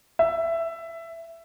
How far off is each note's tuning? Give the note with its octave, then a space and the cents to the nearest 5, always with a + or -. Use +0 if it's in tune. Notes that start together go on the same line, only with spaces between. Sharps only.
E5 +15